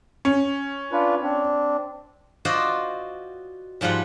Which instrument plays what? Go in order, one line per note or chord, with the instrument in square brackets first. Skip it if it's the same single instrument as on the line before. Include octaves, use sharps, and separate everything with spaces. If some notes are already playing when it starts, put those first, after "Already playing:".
[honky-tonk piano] C#4
[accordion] D4 F4 B4
C4 D4
[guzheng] F4 F#4 C5 D5 D#5
G#2 F3 G3 F4 F#5